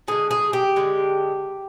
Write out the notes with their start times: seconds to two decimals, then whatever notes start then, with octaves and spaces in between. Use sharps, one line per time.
0.08 D3 G#3 G#4
0.31 G#4
0.53 G4
0.76 D3 G#3